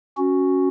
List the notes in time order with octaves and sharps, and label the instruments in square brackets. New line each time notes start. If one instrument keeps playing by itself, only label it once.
[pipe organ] C#4 F#4